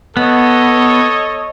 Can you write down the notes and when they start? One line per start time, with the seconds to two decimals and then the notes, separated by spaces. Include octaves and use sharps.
0.17 B3 A4 C#5 D#5